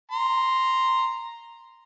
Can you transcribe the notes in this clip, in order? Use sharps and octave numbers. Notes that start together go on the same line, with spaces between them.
A#5 C6